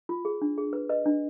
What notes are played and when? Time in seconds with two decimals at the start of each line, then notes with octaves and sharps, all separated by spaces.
0.09 F4
0.25 G#4
0.42 D4
0.58 G#4
0.73 B4
0.89 B4 D#5
1.06 D4